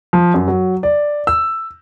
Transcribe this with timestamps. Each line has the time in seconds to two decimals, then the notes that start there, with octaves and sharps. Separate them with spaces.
0.13 F3
0.34 F#2
0.48 F#3
0.83 D5
1.27 E6